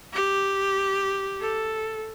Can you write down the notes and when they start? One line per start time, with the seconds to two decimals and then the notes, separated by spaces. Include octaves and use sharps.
0.13 G4
1.40 A4